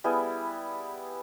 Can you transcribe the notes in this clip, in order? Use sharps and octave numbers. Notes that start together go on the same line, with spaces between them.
G3 B3 E4 G#4